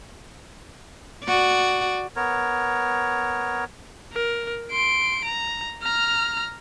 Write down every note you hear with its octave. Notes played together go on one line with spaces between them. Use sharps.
F#4 D5
B3 A#4 C#5
A#4
C6 D7
A#5
A#5 F6